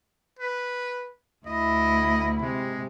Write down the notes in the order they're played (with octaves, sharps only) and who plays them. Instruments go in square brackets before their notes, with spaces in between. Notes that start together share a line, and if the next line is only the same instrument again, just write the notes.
[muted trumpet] B4
[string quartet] D2 E4 [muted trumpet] D#5
[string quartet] C3 [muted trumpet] G#3